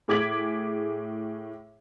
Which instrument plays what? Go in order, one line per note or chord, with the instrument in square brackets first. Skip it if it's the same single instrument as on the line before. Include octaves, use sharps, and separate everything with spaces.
[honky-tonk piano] A2 G#4 D6 G#6 B6 F#7